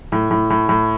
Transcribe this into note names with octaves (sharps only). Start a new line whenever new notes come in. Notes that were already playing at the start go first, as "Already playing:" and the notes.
A2
A2
A2
A2